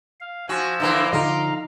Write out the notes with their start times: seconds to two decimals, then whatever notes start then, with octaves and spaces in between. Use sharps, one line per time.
0.21 F5
0.49 F3 F#4 G#5 E6
0.80 D3 E3 A#3 C6 D6
1.13 D3 F3 D#4 F5 A#5